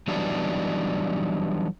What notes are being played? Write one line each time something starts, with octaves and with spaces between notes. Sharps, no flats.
E3 F#3 G3 B3 D4 D#4